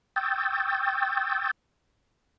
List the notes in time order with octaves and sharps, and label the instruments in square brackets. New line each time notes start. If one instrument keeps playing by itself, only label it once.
[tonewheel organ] G5 C#6 D#6 E6 G6 A6